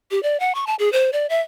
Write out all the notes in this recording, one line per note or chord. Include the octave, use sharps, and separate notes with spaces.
G4
D5
F#5
C#6
A5
G#4
C5
D5
E5